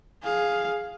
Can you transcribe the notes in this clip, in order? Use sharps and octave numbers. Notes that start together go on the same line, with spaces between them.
G#4 F5